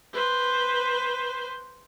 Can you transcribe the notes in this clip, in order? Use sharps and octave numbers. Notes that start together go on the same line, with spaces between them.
B4 C5